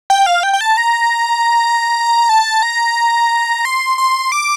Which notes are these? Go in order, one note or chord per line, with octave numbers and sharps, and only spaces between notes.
G5
F5
G5
G5
A5
A#5
A5
A#5
C6
C6
D6